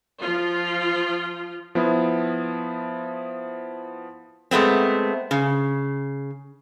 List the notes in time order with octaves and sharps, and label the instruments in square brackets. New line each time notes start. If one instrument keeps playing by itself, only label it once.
[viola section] F3 F4
[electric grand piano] F3 B3 E4
[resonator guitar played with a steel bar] G#3 A3 B3 C4
C#3